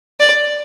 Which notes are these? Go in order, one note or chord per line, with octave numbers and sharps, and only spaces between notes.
D5